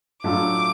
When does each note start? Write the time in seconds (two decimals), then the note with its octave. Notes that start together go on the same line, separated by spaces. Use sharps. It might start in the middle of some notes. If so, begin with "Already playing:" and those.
0.24 A2 F#3 A3 D4 F4 D6